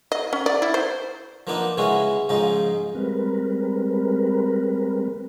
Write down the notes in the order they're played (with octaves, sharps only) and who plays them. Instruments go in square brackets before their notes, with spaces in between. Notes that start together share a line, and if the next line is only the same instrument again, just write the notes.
[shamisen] D#5
C#4
D5
E4
C5
[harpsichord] F3 A#3 B3 D4 D#4
C#3 G#3 B3 C#4 E4 F#4
G#2 C#3 F3 D#4
[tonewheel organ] G3 G#3 C4 A#4 B4